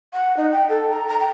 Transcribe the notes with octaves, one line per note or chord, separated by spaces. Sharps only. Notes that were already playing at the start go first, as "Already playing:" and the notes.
F#5
D#4
G5
A4
A#5
A#5
G5